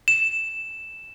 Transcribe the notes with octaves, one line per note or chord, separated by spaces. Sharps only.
E7